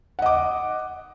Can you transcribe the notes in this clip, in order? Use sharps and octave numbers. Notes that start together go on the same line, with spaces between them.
D#5 F#5 D6